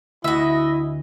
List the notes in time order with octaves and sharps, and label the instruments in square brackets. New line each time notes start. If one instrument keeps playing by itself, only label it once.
[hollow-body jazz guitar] D2 [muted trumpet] E4 [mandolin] F#4 E5 [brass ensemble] D#5